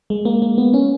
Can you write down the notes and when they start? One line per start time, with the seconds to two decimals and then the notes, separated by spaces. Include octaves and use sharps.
0.10 G#3
0.25 A#3
0.42 A#3
0.58 B3
0.74 C#4